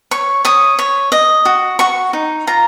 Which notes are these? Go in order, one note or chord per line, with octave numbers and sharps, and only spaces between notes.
C#5 C#6
C#5 D#6
C#5
D#5
F#4
F#4 C#6
D#4
F4 A#5